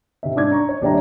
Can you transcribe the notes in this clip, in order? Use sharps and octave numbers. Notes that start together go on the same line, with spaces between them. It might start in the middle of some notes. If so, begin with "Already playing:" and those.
C3 C4 E5
G#2 C#4 D4 D6 G#6
A#5 C#6
C#5
D#1 D4 G4 C#5 E5 A#5